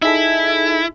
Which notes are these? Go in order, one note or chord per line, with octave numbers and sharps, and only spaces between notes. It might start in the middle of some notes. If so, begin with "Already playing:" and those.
D#4 E4 G#4 A4 E5 B6